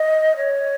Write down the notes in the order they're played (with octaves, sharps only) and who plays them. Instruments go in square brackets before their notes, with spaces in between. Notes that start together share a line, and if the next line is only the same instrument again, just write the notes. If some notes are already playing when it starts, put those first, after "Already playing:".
Already playing: [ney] D#5
C#5